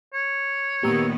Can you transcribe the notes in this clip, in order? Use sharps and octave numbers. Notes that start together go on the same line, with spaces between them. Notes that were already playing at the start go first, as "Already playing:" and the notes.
C#5
A#2 D#3 B3 G4 A#5 E6